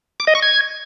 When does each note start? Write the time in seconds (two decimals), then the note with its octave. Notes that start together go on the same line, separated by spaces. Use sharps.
0.20 D6
0.27 D#5
0.35 C#6
0.43 G#6